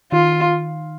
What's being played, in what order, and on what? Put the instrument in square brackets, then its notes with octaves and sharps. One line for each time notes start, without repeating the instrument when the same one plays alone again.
[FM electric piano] D#3 [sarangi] F4